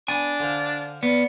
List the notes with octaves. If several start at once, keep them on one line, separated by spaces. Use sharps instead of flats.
B3 D4 G#5
D3 C5 F5
B3 D5